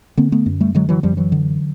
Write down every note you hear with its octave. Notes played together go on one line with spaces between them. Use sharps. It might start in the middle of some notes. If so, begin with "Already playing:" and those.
D3 A#3 C4
A3 B3
F#2
G3 A3
D3 F#3 G#3
E3 F#3
F#2 F3 G3
E3 F#3
D3